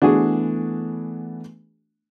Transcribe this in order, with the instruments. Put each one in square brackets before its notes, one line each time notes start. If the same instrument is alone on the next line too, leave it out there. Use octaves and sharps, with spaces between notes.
[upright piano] E3 A3 B3 [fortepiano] D4 F#4 G#4